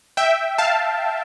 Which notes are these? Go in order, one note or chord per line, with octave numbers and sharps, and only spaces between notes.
E5 G5
F5 A5